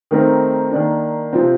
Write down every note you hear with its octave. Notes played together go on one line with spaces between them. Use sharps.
D#3 A3 C4 D#4 A#4
D#3 A#3 D4
C3 F3 C4